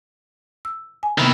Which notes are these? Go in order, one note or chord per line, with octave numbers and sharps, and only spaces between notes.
E6
G#5
C3 D#3 A#3 B3 E4